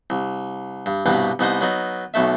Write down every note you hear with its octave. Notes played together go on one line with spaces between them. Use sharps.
C2
G2
C2 G2 B2 B4 F#5 G5
C2 B3 D#4 C5 D#6
F#3 B3 D#4
B1 B2 A3 E5